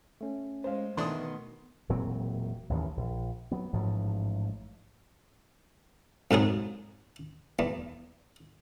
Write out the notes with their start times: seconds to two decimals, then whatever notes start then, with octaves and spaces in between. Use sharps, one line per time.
0.21 A3 C#4
0.64 G#3 C5 F5
0.97 B2 D#3 E3 A3 D4 C6 D#6
1.89 E1 A#2 F#3 C4
2.70 A1 D#2 C#3 E3
2.97 A#1
3.52 F#3 B3
3.73 A1 G#2 F3
6.31 F2 G#2 F#3 G#4
7.59 E2